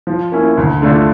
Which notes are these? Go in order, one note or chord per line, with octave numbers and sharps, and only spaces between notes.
F3
A#3 C#4 E4
D2
D3 A3 D4 F4